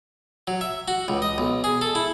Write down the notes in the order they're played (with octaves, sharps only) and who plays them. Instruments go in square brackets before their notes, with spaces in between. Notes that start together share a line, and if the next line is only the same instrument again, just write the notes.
[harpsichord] F#3
E5
F#4
C#2
D#5
B1
G#4
A4
E4